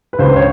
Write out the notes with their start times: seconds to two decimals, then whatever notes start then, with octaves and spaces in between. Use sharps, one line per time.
0.13 B4
0.19 C#2 C5
0.36 C#5